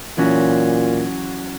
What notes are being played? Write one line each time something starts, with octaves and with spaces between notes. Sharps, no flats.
A#2 E3 F#3 C#4